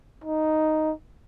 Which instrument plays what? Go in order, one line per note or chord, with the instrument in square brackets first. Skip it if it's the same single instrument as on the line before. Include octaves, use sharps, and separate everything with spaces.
[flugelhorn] D#4